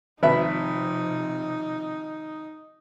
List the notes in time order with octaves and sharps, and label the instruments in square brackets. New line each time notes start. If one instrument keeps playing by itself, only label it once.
[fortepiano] G#1 B4 E5 [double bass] C3 F3 [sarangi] D#4